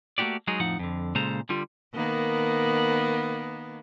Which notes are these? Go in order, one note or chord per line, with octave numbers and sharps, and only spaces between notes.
A3 A#3 C#4 F#4 G4 D5
F#3 G#3 D#4 G#4
F2 A2 F3 D#4 F#5
F2 D3
A#2 C#3 G#3 A4 C5 A#5
D3 G3 F4
D#3 A#3 B3